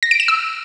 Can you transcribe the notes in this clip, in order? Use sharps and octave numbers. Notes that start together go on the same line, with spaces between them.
A#6
D7
E7
E6